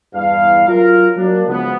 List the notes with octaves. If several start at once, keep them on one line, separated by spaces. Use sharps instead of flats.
E2 G2 F5
F#3 F4 A#4
F#3 A#3 D4
C#2 C#3 F3 F#3 B3